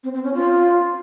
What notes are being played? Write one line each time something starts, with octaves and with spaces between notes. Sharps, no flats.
C4
C4
C#4
F4